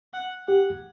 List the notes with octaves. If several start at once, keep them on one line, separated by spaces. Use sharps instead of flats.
F#5
G4 F#5